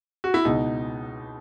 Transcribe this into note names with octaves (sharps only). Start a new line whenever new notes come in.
F#4
E4
C#2 B2 D#4